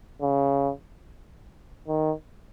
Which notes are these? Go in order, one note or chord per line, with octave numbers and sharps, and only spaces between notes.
C#3
D#3